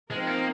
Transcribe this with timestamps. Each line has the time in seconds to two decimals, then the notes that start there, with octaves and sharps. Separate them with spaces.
0.10 F3 G#3 C4 D#4 A#4
0.27 A#3